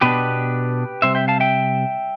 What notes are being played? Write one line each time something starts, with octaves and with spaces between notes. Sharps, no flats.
B2 B3 D4 G4 B4
C3 G3 C4 C5 E5
E5 G5
F5 A5
E5 G5